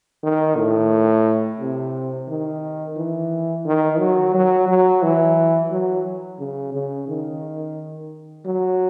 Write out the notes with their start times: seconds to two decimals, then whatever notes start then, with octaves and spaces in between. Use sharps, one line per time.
0.23 D#3
0.57 A2
1.60 C3
2.29 D#3
2.97 E3
3.66 D#3
3.99 F#3
4.34 F#3
4.68 F#3
5.02 E3
5.71 F#3
6.39 C#3
6.74 C#3
7.08 D#3
8.45 F#3